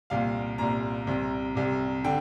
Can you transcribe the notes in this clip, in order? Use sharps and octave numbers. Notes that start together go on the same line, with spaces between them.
C2 A#2 F5
C2 A#2 A#5
C2 C3
C2 C3
D3 G5